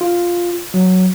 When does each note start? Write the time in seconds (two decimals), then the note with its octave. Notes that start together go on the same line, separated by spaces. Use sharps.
0.01 F4
0.74 F#3